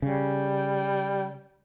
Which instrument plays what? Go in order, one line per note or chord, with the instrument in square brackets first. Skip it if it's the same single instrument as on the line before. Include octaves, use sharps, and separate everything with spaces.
[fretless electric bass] C#3 [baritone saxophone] G3